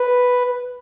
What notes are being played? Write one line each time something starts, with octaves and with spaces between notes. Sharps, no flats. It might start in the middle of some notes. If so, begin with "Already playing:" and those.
Already playing: B4